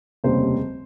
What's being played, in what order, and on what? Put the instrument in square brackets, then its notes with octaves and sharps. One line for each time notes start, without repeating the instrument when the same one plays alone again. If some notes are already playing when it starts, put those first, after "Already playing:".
[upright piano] F1 D#2 C#3 G3 C5